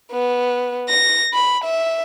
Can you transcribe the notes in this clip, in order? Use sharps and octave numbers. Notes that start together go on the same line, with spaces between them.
B3
A#6
B5
E5